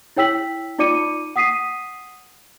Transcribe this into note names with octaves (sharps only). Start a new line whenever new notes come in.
E4 C#5 G5 E6 B6 F#7
D#4 F4 D5 D6 C#7 D#7
F#5 D#6 B6 C7 D#7